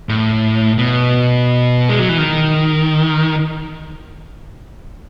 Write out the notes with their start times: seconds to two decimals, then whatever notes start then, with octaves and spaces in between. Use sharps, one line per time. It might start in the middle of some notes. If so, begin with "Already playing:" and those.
0.09 A2
0.78 B2
1.89 G#3
2.00 F#3
2.09 E3
2.18 D#3